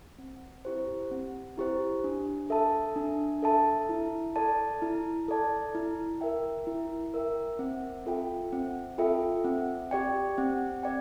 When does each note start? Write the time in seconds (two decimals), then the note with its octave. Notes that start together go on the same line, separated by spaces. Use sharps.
0.18 C4
0.65 E4 G4 C5
1.11 C4
1.58 E4 G4 C5
2.04 D4
2.50 A4 E5 A5
2.96 D4
3.42 A4 E5 A5
3.89 E4
4.36 A4 D5 A5
4.82 E4
5.28 A4 D5 A5
5.75 E4
6.21 A#4 E5 G5
6.67 E4
7.14 A#4 E5 G5
7.59 C4
8.06 F4 A4 E5 G5
8.52 C4
8.98 F4 A4 E5 G5
9.44 C4
9.91 G4 D5 G5
10.38 C4
10.83 D5 G5